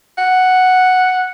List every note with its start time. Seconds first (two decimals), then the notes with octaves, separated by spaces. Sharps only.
0.18 F#5